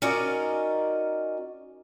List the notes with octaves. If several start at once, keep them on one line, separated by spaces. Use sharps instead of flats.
C#4 D#4 F#4 A#4 D5 D#5